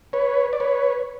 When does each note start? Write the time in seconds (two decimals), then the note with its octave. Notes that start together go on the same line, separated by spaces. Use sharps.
0.13 B4 C#5
0.53 D5
0.60 B4 C#5